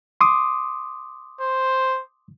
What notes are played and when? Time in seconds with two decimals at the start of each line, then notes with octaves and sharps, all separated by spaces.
0.21 C6 D6 D#6
1.41 C5